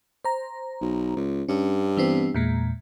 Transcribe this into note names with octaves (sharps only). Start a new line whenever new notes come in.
C5 A#5
B1
C#2
G2 C#4
E3 B3 C4
E2 A#2 G#3